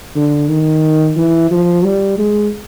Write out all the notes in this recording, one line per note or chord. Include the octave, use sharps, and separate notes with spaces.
D3
D#3
E3
F3
G3
G#3